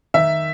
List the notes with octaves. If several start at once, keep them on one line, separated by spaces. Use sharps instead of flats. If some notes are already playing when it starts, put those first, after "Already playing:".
D#3 E5